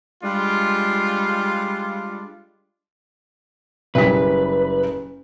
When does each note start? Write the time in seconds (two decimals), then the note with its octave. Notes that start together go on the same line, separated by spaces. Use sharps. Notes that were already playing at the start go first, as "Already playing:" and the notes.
0.24 G3 G#3 D4 F4
3.95 F#1 G3 B4 B6